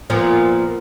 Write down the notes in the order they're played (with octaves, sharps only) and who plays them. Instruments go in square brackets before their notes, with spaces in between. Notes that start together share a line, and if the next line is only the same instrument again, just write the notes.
[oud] A#2 F3 B3